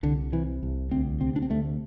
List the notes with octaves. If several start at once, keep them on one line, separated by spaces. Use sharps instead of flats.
C2 D3
C3 E3
C2
D2 C4
C3 C4
D4
C4
D2 A3